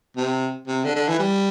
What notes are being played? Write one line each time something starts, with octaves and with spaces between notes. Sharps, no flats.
C3
C3
D3
D3
E3
G3